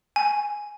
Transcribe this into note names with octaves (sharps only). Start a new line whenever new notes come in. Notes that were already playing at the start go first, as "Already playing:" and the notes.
G#5